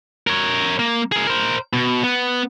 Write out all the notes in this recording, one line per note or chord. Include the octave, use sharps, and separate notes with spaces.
A#4 C#5
A#3
G#4 A#4
A#4 C5
B2
B3